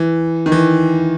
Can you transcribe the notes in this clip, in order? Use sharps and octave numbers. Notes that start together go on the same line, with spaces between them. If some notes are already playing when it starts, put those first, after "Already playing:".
Already playing: E3
D#3
E3